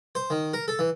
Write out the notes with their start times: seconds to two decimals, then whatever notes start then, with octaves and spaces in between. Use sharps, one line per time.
0.15 C5
0.30 D#3
0.53 A#4
0.68 A4
0.79 E3